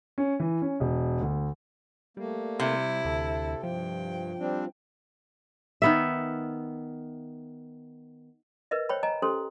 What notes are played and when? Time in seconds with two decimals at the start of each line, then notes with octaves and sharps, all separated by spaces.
0.18 C#4
0.40 E3
0.62 C#4
0.80 E1
1.21 D2
2.17 G3 A3 A#3
2.60 C3 E4
3.05 D2 A4
3.64 G2 F3 G5
4.39 G3 C4 D4
5.82 D#3 B3 E5
8.71 A#4 B4 D#5 E5
8.89 C5 C#5 G5 B5
9.03 D#5 G#5 A#5
9.22 C#4 G4 A4 C5 C6